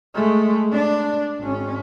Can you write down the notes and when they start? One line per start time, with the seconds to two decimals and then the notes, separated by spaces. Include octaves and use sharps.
0.15 G#3 A3
0.72 D4
1.39 G#1 C#4